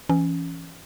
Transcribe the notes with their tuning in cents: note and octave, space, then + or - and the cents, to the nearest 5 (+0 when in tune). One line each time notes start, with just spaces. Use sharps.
E3 +25 C#4 +0